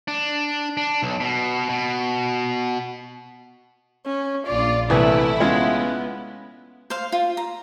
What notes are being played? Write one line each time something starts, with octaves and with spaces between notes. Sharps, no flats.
D4
D4
B1
B2
B2
C#4
A#1 F4 D5
C2 E3 A3 E4
G#3 B3 C#4 F4
C5 F5
F4
A#5